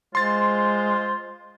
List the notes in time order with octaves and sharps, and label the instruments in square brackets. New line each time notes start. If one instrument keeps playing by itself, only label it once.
[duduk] G#3 [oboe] F4 [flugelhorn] C5 [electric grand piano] C6 A6